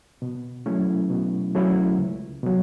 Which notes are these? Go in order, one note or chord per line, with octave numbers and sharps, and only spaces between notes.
B2
F#3 A3 C#4 E4
B2
F#3 A3 C#4 E4
C#2
B2 F#3